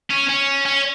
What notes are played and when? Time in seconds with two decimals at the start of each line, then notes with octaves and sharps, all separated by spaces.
0.10 C#4
0.29 C#4
0.66 C#4